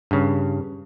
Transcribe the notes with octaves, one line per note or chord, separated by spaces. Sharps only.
G2 C#3